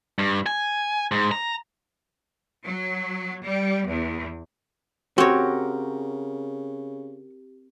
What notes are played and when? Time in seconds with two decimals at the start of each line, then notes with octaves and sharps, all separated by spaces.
0.19 G2
0.46 G#5
1.12 G#2
1.31 A#5
2.66 F#3
3.45 G3
3.87 E2
5.18 C#3 C4 F#4 G4 A#4 C#5